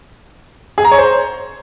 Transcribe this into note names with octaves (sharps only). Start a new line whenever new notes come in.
G#4
A#5
C#5
C5